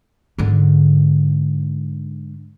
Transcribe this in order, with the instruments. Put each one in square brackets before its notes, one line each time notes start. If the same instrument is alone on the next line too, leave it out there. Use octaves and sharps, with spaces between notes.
[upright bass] G#2 D3